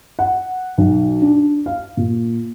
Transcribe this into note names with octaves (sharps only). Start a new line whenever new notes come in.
F#5
B1
D4
F5
A#2